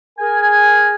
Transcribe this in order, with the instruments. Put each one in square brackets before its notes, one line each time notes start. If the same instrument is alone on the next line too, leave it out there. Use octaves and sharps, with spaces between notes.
[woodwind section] G#4 A#4 G#5